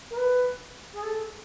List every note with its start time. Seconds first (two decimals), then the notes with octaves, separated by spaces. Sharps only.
0.10 A#4
0.17 B4
0.94 G#4
1.03 A4